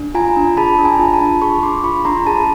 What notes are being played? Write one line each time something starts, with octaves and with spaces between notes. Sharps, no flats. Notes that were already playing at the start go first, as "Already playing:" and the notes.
Already playing: D4
F4 G#5 A#5
D4
G#4 A5 B5
D4 B5
G#5 A#5
F4
A5 B5
D4
G#4 B5 C#6
D4 C6 D6
F4 B5 C#6
D4 A#5 C6
G#4 A5 B5